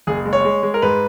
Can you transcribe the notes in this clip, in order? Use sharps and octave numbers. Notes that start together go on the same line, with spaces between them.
F#1 G#4
G#3
C#5
G#3
G#3
A#4
G#2 B4